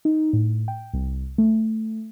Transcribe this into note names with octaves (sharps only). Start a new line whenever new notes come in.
D#4
A2
G5
C2
A3